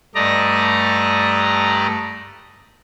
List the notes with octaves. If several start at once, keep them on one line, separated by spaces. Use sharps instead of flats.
G2 A3 D5 D#5 A#5